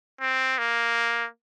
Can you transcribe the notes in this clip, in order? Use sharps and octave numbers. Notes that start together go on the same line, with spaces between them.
C4
A#3